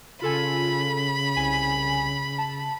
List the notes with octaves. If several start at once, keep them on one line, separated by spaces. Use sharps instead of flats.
C#3 F4 A4 G#5 B5
C2 G#5 B6
A5